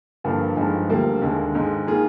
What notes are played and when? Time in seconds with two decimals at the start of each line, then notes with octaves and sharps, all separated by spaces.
0.24 G2 D3 F3 A#3 D4
0.56 G2 F3 G#3 D#4
0.89 D2 D3 G3 A#3
1.22 D#2 D3 G#3
1.55 G#2 D#3 G#3 D#4
1.87 D#3 A#3 F4 G#4